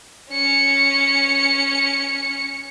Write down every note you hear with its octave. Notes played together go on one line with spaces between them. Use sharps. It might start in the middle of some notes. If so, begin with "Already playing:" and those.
C#4 C#7